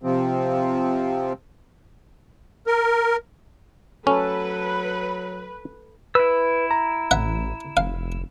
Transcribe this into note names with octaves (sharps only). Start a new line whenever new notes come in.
C3 F3 C4
A#4
F#3 C#4 A4 B4
E4 B4 E6
A#5
A1 E5 F#5
F1 F5